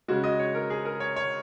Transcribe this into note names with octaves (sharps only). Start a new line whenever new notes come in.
C#3 G#3 F#4
D#5
C#5
A#4
G#4
A#4
C#5
C#5